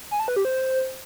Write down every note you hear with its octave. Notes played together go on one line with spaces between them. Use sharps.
G#5
A5
B4
G4
C5